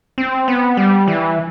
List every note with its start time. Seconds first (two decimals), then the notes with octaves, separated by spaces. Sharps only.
0.18 C4
0.48 B3
0.77 G3
1.08 E3